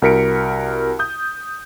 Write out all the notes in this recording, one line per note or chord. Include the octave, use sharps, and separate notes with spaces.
C2 F#4 A#4 B6 C#7 D7
D#6 G6